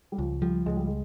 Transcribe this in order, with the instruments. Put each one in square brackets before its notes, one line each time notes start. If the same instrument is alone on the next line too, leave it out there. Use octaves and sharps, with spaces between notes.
[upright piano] G3
[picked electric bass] C#2 [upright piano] F3
[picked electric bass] F3 [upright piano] G3
[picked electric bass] C#2 [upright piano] G#3
[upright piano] G3
G#3